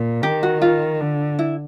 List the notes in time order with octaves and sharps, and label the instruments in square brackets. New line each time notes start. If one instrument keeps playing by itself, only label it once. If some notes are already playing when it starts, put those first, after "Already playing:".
Already playing: [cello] A#2
[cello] D#3 [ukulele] G4
[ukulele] F#4
F4
[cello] D3
[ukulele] E4